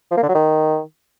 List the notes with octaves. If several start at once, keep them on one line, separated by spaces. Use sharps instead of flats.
F3
A#3
D3
F#3
D#3